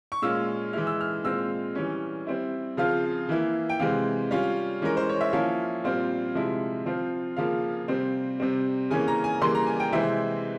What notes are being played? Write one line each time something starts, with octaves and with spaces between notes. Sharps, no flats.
C#6
A#2 G#3 C#4 F4 E6
E3 G#3 E4 F6
E6
F6
A#2 G#3 C4 F4 E6
E3 G3 C#4
G3 C4 E4
C#3 F3 C4 F4 F5
E3 A#3 E4
G5
C3 E3 G#3 C4 F5
G3 C#4 F4
E3 G#3 C#4 A#4
C5
C#5
E5
F3 A#3 C#4 E4 F5
A#2 G3 C4 F4
C3 F3 G#3 E4
F3 C4 F4
C#3 F3 A#3 F4 F5
C3 G3 C4
C3 G3 C4
C#3 E3 A#3 C#4 G#5
A#5
G#5
C#3 E3 G3 A#3 C6
A#5
G#5
G5
C3 E3 G#3 C4 E4 E5